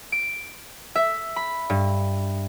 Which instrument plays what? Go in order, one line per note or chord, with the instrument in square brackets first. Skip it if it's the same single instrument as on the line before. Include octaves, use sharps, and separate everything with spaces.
[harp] D7
E5
B5
G2